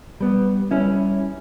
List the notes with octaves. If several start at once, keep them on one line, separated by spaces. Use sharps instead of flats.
G3 B3
G3 C#4 E4